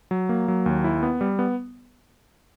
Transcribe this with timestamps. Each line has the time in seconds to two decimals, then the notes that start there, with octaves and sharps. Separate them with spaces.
0.11 F#3
0.29 A#3
0.48 F#3
0.66 D#2
0.84 E4
1.03 B3
1.21 G3
1.39 B3